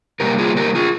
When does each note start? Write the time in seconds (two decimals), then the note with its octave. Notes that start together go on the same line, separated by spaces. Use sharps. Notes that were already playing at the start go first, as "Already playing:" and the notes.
0.20 C3 G3 A#3 G4 A#4
0.38 F4 G#4
0.57 G4 A#4
0.75 F4 G#4